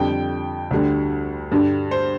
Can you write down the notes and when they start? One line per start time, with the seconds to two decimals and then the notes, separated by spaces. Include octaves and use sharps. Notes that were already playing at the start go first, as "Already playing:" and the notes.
Already playing: F2 D3 G3 G5
0.71 D2 D3 G3
1.52 G2 D3 G3
1.91 C5